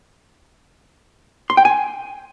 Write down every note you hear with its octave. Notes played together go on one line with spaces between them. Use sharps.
C6
G5
G#5